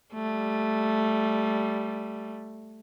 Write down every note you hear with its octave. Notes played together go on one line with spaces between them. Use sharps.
G3 A3